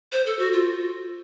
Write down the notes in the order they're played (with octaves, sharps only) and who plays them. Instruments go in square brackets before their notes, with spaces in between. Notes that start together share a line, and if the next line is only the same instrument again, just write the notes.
[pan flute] C5
A4
F#4
F4